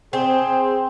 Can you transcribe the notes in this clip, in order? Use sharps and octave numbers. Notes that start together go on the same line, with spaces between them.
C4 G#4